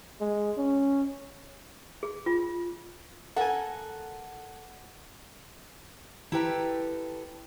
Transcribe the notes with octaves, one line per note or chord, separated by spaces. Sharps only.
G#3
C#4
G#4
F4
A4 A#4 F#5 G#5
E4 G4 A4 B4 G5 A#5